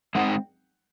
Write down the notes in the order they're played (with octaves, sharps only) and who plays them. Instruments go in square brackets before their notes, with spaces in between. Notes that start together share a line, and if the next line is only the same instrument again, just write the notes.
[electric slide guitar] G#3 C4 D#4 G#4 C5 [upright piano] F#5
[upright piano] G5